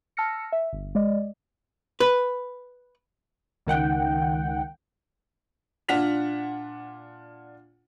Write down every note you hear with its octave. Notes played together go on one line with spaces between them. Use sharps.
A5 E6 F6 A#6 C#7
E5
G1
G#3 D5 D#5
B4
C#2 D#3 F#5 G5
A#2 D4 F4 F#5 B6 F7